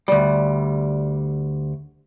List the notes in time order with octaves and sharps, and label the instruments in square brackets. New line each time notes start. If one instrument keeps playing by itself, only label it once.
[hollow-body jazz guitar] D2 G3